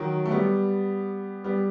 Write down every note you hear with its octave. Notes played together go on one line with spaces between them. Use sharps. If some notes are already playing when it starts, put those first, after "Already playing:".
Already playing: D#3 F#3
A3
G3 B3
G3 B3